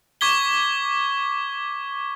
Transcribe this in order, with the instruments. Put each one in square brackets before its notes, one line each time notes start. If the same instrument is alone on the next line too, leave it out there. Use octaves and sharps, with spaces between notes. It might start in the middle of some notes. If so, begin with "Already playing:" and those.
[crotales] C#6 D6 G#6 B6 G7